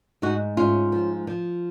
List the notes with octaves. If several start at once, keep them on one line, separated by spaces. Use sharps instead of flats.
G#2 D#4 F#4
G#2 C#4 F4
F3
F3